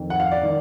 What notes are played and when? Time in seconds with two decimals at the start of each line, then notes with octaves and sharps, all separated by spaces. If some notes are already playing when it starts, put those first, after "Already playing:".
Already playing: F2 D#3
0.10 F#5
0.20 F5
0.31 D5
0.43 D#3